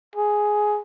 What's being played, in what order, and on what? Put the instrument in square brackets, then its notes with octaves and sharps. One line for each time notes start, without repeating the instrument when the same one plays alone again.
[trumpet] G#4